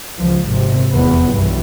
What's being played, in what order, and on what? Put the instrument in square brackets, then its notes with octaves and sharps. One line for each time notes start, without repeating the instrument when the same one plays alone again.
[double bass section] C#2 F3
G#1 C3
F1 E2 B3
B1 G2 E3